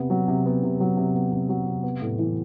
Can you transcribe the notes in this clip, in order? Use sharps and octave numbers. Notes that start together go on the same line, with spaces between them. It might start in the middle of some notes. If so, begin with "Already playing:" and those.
Already playing: C3 B3
F#3
C3
B3
C3
F#3
C3
B3
C3
F#3
C3
B3
A2
E3